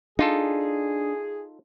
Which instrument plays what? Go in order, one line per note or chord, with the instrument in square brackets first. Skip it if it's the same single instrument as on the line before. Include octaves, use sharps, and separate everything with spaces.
[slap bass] D4 [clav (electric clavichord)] D#4 F4 A4 [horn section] G#4